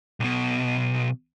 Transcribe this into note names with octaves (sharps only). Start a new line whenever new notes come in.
B1 B2